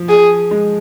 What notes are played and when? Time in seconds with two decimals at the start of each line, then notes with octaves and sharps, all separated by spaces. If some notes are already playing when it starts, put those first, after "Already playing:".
Already playing: F3
0.09 G#4
0.51 G#3